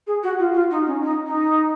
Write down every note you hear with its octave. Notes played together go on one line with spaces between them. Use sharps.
G#4
F#4
F4
F4
D#4
C#4
D#4
D#4